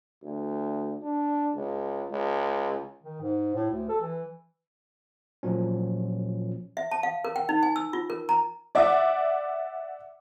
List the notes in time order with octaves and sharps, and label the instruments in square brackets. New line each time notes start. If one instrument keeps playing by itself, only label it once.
[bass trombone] D2
D4
C#2
C#2
[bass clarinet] D#3
G#2
A2
D2
A4
E3
[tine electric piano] A#2 F3 F#3 C#4
[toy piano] E5
A5
F5
A#4
G5
D#4
G#5
E6
F4
A#4
A#5
[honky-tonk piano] D5 E5 F#5 D6